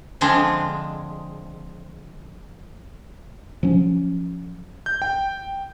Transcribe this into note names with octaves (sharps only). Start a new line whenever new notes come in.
D3 F3 G#3 C4 D4
F3 F#3 C#4
G6
G5